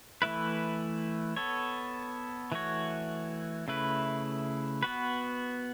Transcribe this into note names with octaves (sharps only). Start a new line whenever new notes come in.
E3 A3 E4 B4
B3 A4 C#5
E3 A3 F#4 C#5
C#3 A3 E4 B4
B3 F#4 B4